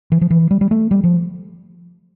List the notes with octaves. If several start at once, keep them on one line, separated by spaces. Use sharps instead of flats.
E3
F3
E3
G3
G3
A3
G3
F3